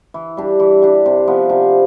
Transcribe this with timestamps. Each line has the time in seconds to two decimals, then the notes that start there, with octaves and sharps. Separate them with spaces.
0.14 E3
0.37 G3 D4 G4
0.60 E3
0.82 G3 D4 G4
1.06 C3
1.28 F3 B3
1.50 C3